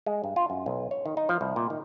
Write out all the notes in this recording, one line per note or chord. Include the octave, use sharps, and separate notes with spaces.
G#3
G2
F4
F#2
B1
C#5
D#3
D#4
F3
C2
A#2
D#3